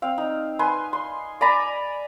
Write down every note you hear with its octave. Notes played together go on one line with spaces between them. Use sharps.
C4 F5
D#4
B4 G#5 C6
C6
D5 G#5 A#5 B5